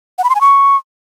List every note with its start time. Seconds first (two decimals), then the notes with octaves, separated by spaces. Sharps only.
0.18 F#5
0.24 B5
0.30 C6
0.35 G#5
0.41 C#6